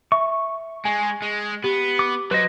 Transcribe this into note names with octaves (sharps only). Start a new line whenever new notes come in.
E5 C#6
G#3 G#5
G#3
B3 G4
D6
F#3 B4 C5 D#5